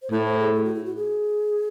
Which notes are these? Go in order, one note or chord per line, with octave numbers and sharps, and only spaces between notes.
C5
A2 A4
C5
G#4
G#4
F#4
E4
F#4
G#4